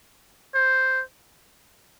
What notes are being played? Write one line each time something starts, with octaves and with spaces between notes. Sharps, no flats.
C5